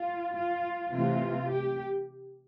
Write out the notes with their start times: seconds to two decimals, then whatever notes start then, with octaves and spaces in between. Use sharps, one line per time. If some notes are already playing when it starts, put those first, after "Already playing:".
Already playing: F4
0.34 F4
0.92 C3 E3 A3 C4 F4
1.50 G4